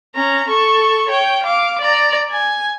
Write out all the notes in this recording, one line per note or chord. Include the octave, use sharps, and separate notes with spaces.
C#4 A#5
A4 C#6
C#5 G5
F5 D6
D5 A#5
G#5